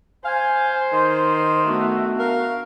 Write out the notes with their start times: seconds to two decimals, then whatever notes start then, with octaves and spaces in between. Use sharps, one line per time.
0.25 C5 F5 G#5
0.93 D#3 C6
1.67 A3 B3 D4 F#4
2.19 A#4 F5